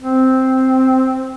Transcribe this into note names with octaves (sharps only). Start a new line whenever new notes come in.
C4